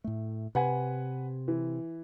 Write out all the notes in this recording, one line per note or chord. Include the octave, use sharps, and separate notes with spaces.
A2 A3
C3 B4 F#5 G#5
E3